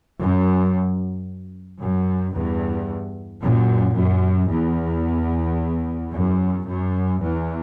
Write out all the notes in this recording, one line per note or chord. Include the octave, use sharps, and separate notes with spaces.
F#2
F#2
E2 G2
F#2 A#2
F#2
E2
F#2
F#2
E2